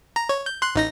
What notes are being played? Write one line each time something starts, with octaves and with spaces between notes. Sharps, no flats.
A#5
C#5
G6
C6 F#6
A1 D#4 A#6